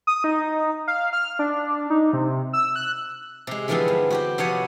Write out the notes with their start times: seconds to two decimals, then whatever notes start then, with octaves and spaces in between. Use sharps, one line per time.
0.07 D#6
0.24 D#4
0.88 F5
1.13 F6
1.39 D4
1.90 D#4
2.13 C3
2.53 E6
2.76 F#6
3.47 C3 G#3
3.68 D3 E3 F3 G#3 B3 C4
3.88 G2
4.10 F#4 G4 G5
4.38 C3 F3 B3 C#5 F#5 G#5